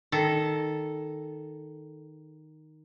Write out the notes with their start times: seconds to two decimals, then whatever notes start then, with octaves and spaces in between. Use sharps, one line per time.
0.12 D#3 A4